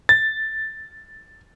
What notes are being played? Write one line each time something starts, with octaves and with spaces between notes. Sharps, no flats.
A6